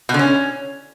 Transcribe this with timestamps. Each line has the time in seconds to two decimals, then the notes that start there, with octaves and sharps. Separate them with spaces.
0.09 B2
0.14 D3
0.19 C#4